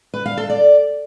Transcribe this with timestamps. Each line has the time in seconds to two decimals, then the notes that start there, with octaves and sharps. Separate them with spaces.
0.14 B4
0.26 F5
0.38 A4
0.49 D5